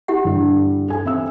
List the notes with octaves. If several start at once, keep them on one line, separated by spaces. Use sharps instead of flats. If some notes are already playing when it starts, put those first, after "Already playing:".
E4 G4 F#5
G2 D3
A4 G#5
C4 E5 E6